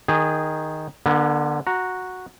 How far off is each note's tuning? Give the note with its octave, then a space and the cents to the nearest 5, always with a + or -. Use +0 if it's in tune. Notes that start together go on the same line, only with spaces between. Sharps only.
D#3 +0 G#4 -20
D3 +20 B3 -40
F#4 -5 A#5 +0